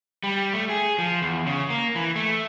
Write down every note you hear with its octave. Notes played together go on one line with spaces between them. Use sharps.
G3
A3
G#4
F3
E2
C#3
A#3
E3
A3